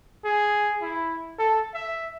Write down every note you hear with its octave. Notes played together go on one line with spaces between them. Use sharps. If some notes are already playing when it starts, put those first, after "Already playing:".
G#4
E4
A4
E5